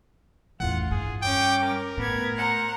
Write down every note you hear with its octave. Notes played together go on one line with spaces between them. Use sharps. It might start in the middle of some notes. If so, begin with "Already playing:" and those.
A1 E2 F4 F#5
G2 G#4
C#4 G5 D6
A#4
A2 B3 G#6
C5 F#5 A#5